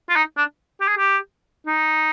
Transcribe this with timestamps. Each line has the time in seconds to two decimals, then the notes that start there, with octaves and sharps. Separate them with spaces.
0.09 F4
0.16 D#4
0.37 D4
0.80 G4
0.88 G#4
0.97 G4
1.66 D#4